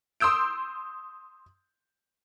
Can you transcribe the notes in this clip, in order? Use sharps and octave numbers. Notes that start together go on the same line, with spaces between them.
C6 D#6 E6 G6 D7